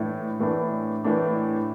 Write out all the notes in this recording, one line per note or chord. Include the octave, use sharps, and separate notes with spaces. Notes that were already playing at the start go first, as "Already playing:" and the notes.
Already playing: A2 E3 A3 D4
A2 E3 A3 D4
A2 E3 A3 D4